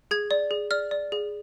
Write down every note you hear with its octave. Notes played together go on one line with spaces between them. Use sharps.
G#4 G#6
D5
G#4
D5 F6
D5
G#4